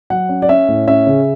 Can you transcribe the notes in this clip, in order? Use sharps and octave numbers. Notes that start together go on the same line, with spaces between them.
F#3 F#5
C#4
D5
C#4 E5
A2
C#4 E5
C#3